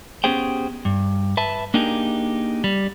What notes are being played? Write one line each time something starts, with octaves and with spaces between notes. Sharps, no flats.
B3 C#4 G4 G#4 C5 G5
G2
B4 E5 A5
A#3 D4 D#4 G4 G#4 A#4
G3